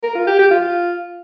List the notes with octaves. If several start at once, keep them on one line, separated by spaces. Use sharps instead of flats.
A#4
F4
G4
G4
F4